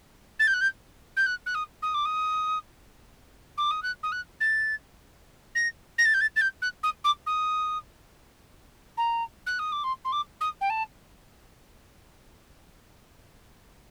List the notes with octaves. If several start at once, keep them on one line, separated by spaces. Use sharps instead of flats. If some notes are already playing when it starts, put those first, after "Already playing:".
A6
G6
F#6
G6
G6
F#6
F#6
D#6
D#6
D6
D#6
D6
D#6
F#6
D#6
F#6
A6
A#6
A#6
A6
G6
A6
A6
G6
F#6
D#6
D6
D#6
A#5
F#6
D#6
D6
C6
C6
D6
D#6
G5
A5